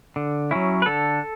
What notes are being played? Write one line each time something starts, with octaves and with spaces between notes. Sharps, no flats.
D3
F#3 C#4 E4
B4
D3 A4